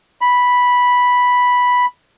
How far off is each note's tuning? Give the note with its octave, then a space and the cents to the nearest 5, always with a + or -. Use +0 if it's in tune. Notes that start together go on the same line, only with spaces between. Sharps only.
B5 -5